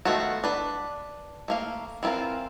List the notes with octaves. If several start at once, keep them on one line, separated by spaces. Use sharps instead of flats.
D#3 A3 B3 F4 F#4
D4 B4
A3 A#3 F5
E3 C4 E4 F4 A#4